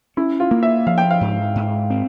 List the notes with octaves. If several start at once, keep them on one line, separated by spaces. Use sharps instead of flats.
C#4 E4
F4
A#3
E5
F3 F5
G5
F5
G#2
G#2
C4